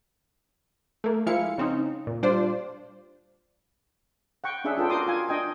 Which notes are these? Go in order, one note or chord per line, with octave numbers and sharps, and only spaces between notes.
A3 A#3
F3 G#3 E4 F5 C#7
C#3 C4 C#4 D#4
A#2
G3 D4 F4 C5 D5
F#5 G5 C#6
C#4 D4 G#4 E5 F#5
D4 F4 A4 B4 G5
F#4 A4 A#4 C6 D6 D#6
F4 G#5
D4 D#5 G5 G#5